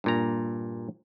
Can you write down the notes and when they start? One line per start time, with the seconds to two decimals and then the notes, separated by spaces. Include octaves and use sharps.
0.04 G2 A#2 A#5